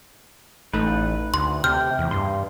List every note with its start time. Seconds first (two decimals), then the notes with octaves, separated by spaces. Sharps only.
0.74 A1 A3 D#4 B4
1.34 D2 C6
1.64 C3 G5 F6
1.99 E2
2.11 G2 C6